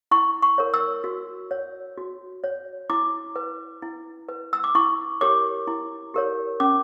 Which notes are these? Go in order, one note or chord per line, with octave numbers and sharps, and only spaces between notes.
E4 C#6
C#6
A#4 C#5
E6
F#4
C#5
F#4
C#5
E4 D6
B4
E4
B4
E6
D6
E4 C#6
G4 A#4 C#5 D6
E4
G4 A#4 C#5
C#4 D6